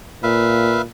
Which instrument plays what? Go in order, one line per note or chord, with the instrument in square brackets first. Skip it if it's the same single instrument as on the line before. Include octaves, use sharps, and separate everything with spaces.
[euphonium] A#2 [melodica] B4 E5 F5